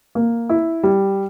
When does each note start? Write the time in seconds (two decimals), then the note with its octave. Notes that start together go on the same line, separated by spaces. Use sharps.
0.15 A#3
0.49 E4
0.83 G3